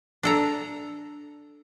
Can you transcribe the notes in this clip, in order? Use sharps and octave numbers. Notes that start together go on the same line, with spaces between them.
D4 A4 A#5